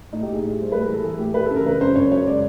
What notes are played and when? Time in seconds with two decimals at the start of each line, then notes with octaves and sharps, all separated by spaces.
0.13 A2 D#4
0.23 A2 G4
0.33 G#4
0.42 A2
0.59 G3 C5
0.72 A2 B4
0.83 A#4
0.88 E3
0.94 A4
1.04 E3 G#4
1.19 A2 G4
1.34 E3 B4
1.46 C#3 A4
1.56 A#4
1.66 C#3 B4
1.81 F#2 C5
1.96 F#2 C#5
2.11 C#3 C#5
2.27 G#3 D5